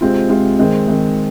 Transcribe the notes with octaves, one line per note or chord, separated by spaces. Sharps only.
C3 G#3 C4 F4
C3 G#3 C4 F4
D#3 G#3 C4
D#3 G#3 C4